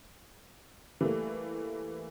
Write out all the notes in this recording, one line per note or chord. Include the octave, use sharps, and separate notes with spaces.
E3 G3 A3 A#3